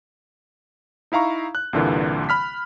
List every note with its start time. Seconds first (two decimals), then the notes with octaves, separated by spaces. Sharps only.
1.12 D#4 E4 F5 A#5 C#6
1.55 F#6
1.73 C2 G2 A#2 D3 E3 A#3
2.29 B5 F6 B6